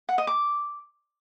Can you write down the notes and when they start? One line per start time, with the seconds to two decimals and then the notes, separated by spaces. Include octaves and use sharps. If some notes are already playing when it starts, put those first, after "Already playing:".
0.09 F#5
0.18 D#5
0.27 D6